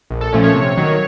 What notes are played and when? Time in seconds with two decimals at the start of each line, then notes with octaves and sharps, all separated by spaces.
0.10 A#1
0.21 A4
0.33 A#2 F3 A3 C#4
0.44 C#5
0.54 C3
0.77 D#3 F#3